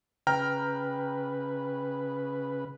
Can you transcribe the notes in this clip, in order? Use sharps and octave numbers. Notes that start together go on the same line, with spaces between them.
C#3 B4 G5 A#5 F6